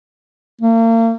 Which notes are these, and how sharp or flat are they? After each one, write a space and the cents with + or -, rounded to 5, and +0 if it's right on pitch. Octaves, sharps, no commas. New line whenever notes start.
A#3 -40